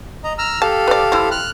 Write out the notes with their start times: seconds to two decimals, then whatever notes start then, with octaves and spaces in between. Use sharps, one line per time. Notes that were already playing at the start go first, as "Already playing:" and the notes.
0.24 D#5 A#5
0.38 A#5 E6 F6
0.62 G4 A4 F5 A5
0.88 B4 D5
1.12 C4 E4
1.31 F6 F#6